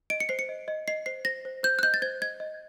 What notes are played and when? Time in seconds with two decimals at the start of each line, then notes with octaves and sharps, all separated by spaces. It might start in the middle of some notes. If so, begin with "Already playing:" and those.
0.10 D#5 D7
0.20 C#7
0.29 C5 C7
0.39 C#7
0.49 D#5
0.68 D#5
0.88 D#5 C7
1.06 C5 C7
1.25 C5 A#6
1.45 C5
1.63 C5 G6
1.79 F#6
1.83 D#5 G6
1.94 A6
2.02 C5 G#6
2.21 D#5 G#6
2.40 D#5